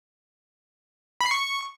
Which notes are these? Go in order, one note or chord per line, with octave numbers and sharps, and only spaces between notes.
B5
C7
C#6